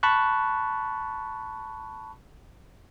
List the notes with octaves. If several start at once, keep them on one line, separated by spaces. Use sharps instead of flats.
A5 B5 C#6 F#6